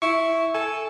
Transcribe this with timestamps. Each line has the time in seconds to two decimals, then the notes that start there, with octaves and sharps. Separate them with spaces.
0.02 E4 C#6
0.55 A4 G#5